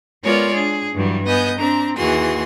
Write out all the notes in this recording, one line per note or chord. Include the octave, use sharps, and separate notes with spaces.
G#3 B3 F4 A#4 C#5 D5
D4 G#4
G2 E3 F#3 G3
B3 B4 D#5 G#5 G6
C4 D4 A#5
D#2 E3 F#4 G#4 C6